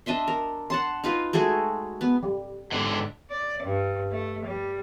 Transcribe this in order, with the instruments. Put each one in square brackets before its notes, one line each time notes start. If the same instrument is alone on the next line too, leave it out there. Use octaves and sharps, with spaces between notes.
[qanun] D4 D#5 E5 C6
A#4
F#5 A5 C6
D#4 F4 B4
G#3 A3 F#4 G#4
B3
[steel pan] G3
[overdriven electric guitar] G#2 D3
[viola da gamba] D5
G2
A3
G3